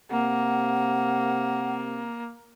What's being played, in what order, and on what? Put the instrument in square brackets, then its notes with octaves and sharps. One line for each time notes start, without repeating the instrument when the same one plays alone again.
[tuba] C3 [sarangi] A#3 [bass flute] F#5